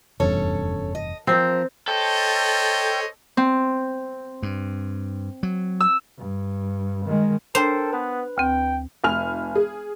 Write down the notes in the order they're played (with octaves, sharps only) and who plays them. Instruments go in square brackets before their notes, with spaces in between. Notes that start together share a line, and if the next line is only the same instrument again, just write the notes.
[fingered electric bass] F1 E2 G2 [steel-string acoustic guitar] C#4 A4 C#5
[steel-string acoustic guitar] D#5
[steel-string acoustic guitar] F3 A#4 C5 [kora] C4
[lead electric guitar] A4 [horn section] C5 C#5 D#5 [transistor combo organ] G5
[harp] C4
[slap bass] G2
F#3
[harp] E6
[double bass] G2
D#3 G#3
[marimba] D4 [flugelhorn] A4 [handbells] A#4 G5 A5 [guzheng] C5
[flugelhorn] B3 [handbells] B4
[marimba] D2 C4 [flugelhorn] G5
[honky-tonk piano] F1 G#5 F6 F7
G#4